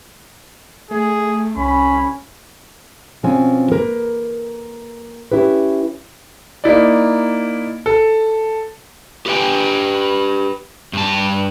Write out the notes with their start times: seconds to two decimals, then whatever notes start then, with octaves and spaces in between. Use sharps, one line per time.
0.91 A3 G#4
1.57 C2 C#4 B5
3.23 B2 F3 C4 C#4 G#5
3.72 A#3 A#4 B4
5.32 C#4 E4 G4 B4
6.64 A#3 D#4 E4 D5
7.86 A4
9.26 G4 G#4 B4 D#5 G5 G#5
10.93 G2 A5